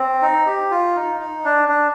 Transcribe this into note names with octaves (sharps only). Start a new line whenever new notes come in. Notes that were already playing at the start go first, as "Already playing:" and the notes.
Already playing: C4
D#4
G4
F4
D#4
D#4
D4
D4